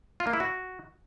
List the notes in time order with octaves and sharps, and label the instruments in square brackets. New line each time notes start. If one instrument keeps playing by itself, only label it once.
[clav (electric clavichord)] F4
A#3
E4
F#4